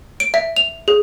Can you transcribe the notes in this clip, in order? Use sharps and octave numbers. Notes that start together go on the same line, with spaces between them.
D7
E5
F7
G#4